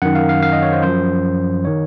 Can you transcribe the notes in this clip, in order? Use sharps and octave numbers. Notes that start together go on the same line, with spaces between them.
F#2 D#3 F#5
F5
F5
F5
D#5
C#5
C5
F#2 F3 C5
D#3 C#5